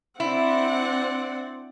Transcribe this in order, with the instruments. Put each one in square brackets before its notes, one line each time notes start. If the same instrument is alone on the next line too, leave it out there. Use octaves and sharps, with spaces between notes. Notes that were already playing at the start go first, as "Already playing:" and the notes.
[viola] C4 F#5 [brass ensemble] D4 C5 D5 [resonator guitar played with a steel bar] E4